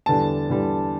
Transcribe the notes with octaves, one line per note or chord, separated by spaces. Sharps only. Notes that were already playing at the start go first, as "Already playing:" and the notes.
E2 D3 G3 A5
E2 D3 G3